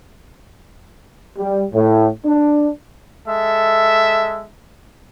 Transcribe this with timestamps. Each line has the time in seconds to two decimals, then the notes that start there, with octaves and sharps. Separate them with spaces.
1.37 G3
1.74 A2
2.25 D4
3.28 G#3 A4 E5